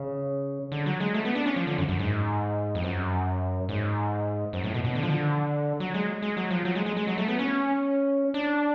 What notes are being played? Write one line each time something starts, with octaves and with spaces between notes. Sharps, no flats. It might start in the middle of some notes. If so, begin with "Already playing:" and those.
Already playing: C#3
D3
F#3
G#3
A3
B3
D4
C#4
F3
D3
F#2
F#2
G#2
F2
F#2
G#2
F#2
A2
B2
B2
D3
F3
D3
F#3
G#3
G#3
F#3
F3
F#3
G#3
G#3
G#3
F#3
A3
B3
C#4
D4